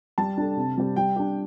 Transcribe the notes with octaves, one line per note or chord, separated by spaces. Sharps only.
G3 A5
D4 A4
C3
G3 C4 G4
G3 G5
D4 G4